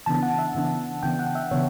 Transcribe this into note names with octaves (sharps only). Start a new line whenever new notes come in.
C#3 E3 B3 D4 A5
F#5
E5
C#3 E3 B3 D4
C#3 E3 B3 D4 G5
F#5
E5
C#3 E3 B3 D4 C#5